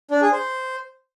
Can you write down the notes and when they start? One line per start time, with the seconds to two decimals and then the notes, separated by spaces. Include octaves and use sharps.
0.11 D4
0.22 G#4
0.32 C5